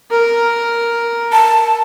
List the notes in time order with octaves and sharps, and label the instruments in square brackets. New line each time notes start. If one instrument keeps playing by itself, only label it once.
[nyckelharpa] A#4
[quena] A5